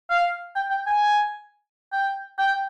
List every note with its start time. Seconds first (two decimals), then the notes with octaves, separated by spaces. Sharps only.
0.10 F5
0.56 G5
0.70 G5
0.87 G#5
1.93 G5
2.39 G5